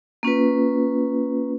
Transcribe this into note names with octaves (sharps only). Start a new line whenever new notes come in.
A#3 C#4 F4 B4